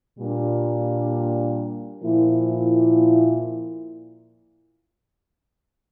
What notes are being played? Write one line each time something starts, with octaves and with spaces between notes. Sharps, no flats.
A#2 G3 A#3 D4
A#2 F3 A#3 E4